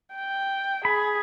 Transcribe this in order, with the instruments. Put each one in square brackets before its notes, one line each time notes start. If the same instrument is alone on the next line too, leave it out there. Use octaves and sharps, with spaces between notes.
[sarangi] G5
[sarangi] G#4 [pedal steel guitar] B5